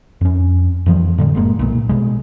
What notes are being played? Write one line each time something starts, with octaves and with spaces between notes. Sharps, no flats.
F2 C#4
F2 E3 F3 G3
A2 D3 G3
F#1 G#3 A#3
B1 A#2
B2 G3 G#3